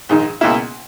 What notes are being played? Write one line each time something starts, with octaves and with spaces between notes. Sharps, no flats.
A#1 G#2 D#3
C#2 B2 A#3 E4